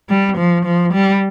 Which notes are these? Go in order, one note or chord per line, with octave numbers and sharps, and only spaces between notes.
G3
F3
F3
G3